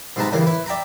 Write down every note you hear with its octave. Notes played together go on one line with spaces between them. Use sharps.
G#2 C3 G#3 B4 A5 A#5
G2 C#3 E3 A#3
E4 B4
D5 E5 G5 A#5 B5